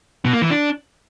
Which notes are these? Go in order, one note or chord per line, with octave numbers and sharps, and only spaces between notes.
B2
A#3
E3
D4